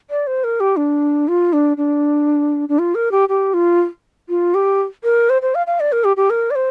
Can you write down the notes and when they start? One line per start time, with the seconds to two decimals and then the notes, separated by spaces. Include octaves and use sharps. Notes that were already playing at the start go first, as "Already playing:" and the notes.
0.10 D5
0.27 C5
0.44 A#4
0.60 G4
0.77 D4
1.28 F4
1.53 D4
1.77 D4
2.69 D4
2.79 F4
2.95 A#4
3.11 G4
3.29 G4
3.54 F4
4.29 F4
4.54 G4
5.04 A#4
5.30 C5
5.42 C5
5.55 F5
5.67 F5
5.80 D5
5.92 A#4
6.04 G4
6.17 G4
6.30 A#4
6.51 D5
6.55 C5